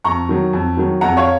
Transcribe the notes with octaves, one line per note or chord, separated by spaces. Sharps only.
F2 A#5 C#6
D#3 F#3
F2
D#3 F#3
F2 F#5 A#5
C#5 F5